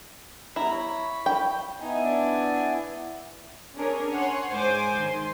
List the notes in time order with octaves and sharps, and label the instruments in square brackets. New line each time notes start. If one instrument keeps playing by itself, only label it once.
[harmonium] G#2 G3 B3 [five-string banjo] E4 [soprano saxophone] A#5
[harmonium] C#5 [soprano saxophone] B5
[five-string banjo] G5
[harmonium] B3 E4 G#5 [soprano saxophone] D#4
[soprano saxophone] D4
[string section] C#4 D4 G#4 A#4 C#5
C#5 F#5 G#5 C6
G#2 G#4 C5 G#5 D6
D#3 C6